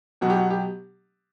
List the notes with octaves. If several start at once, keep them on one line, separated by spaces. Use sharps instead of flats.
B2 F#3 B3 F#4
G4
F#4
G4